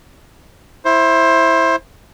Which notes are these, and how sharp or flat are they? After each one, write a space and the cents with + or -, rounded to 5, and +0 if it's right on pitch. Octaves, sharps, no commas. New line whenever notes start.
E4 +0 C5 +20